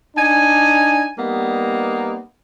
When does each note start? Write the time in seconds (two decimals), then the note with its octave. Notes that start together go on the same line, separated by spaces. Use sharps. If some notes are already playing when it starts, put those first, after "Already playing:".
0.17 D4 D#4 G#5
1.18 G3 A#3 B3 D#4